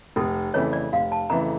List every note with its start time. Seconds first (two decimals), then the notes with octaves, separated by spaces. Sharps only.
0.16 F1 A4
0.54 F2 C#3 E3 A3 C#5
0.73 D5
0.93 F1 F5
1.12 A5
1.30 F2 C#3 E3 A3 A#5